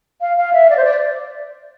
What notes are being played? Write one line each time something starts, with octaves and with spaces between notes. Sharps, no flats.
F5
F5
E5
D5
C5
D5